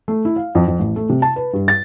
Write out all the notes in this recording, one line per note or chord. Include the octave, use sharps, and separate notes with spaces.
A3
E4
F5
F2
F2
A1
A3
C3
A5
B4
G2
A6